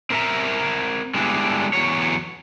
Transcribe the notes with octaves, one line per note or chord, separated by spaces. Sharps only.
C4 A#4 B4 E5 A#5
D3 G3 G#3 B3 D4 E4
E2 F#3 C#5